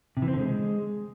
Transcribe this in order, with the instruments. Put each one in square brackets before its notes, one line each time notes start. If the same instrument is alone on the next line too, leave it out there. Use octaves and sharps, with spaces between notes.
[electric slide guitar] C3
E3
C4
D3
G#3